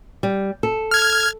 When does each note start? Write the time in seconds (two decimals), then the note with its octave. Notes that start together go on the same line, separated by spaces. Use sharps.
0.23 G3
0.63 A4
0.91 F6 G#6